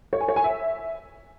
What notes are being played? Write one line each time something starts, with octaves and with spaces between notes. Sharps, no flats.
C#5
G#5
C#5
G#5
E5